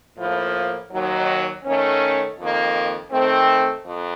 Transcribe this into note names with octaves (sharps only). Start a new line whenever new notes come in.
A2 F3 A#3
D#2 D#3 F#3
D#3 A3 C#4
F2 D#3 A#3
D#3 A3 C4
F2